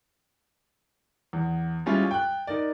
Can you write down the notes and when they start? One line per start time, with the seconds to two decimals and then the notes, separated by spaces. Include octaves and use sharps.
1.33 E2
1.86 G3 G#3 C#4 E4 F4 G#4
2.11 G5 F#6
2.47 D#4 A#4 D5